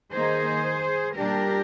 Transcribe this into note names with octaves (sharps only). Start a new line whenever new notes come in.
D#3 A#3 D#4 G#4 C5
A#2 G3 D4 G4 A#4